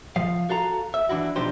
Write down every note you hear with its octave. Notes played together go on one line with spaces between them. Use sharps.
F3 F5
F#4 A4 F5 A#5
E5
E3 D4 E4 F#4
B2 F3 D4 D#4 G4 C5